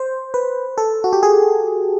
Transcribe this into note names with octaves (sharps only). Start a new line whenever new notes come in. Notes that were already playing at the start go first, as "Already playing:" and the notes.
Already playing: C5
B4
A4
F#4
G4
G#4